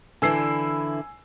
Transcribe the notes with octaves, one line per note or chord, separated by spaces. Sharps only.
D3 E3 E4 G#5 E6 C7